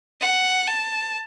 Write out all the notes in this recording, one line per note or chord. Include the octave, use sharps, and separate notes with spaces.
F#5
A5